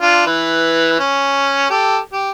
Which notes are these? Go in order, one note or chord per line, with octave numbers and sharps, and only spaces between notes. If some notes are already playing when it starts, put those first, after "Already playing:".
D4 F4
E3 B4
C#4
G4 A4
G4